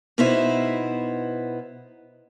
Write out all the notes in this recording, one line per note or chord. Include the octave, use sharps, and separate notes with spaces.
B2 B3 D#4 E4 C5 E5